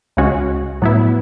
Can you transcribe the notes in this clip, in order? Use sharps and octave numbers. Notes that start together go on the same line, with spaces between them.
C#2 C#3 G#3 C#4 F#4
A2 F#3 B3 E4